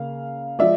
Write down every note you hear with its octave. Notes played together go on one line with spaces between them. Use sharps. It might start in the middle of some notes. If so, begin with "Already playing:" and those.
Already playing: C#3 A#3 F5
F3 G#3 D5 E5